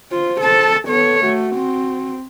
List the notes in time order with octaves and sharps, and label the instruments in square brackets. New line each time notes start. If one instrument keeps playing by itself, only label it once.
[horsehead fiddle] F4 [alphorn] C5
[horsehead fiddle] A4 A5
[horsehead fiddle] B3 C#5 [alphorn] A4
[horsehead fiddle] A3 [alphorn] F#4
[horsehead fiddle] C4